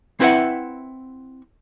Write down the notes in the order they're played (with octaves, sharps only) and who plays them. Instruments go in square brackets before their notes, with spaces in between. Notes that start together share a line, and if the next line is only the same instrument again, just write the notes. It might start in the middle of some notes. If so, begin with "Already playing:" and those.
[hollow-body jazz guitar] C4 E4 B4 E5 F#5